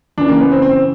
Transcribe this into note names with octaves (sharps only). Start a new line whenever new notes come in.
F#2 C#3 E3 D4
A#3
B3
C4
C4